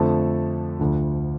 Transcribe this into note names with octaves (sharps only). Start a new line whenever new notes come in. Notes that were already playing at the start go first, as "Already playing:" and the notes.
Already playing: F2 D3 F3 A3 A5
D2 D3 F3